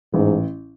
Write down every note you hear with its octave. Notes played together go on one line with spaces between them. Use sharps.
A1 G#2